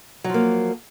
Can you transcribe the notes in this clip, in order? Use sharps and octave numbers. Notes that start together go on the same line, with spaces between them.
F3 F#3 A#3